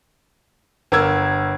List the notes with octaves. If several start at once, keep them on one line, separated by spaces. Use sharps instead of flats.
G1 A#4 E6 G#6